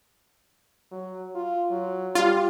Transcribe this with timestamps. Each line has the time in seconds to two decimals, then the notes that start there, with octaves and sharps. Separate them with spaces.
0.91 F#3
1.35 F4
1.71 F#3
2.15 G3 F4